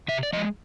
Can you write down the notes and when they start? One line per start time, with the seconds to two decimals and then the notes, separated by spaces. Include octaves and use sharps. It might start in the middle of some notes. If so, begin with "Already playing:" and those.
0.08 C3 E5
0.23 D5
0.33 F3 D#5
0.37 G#3